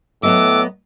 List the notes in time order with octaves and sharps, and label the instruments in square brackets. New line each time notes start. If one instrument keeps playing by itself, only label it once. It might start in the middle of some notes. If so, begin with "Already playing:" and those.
[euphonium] A2 [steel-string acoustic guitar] F#3 B3 D#5 [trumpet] D6 [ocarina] E6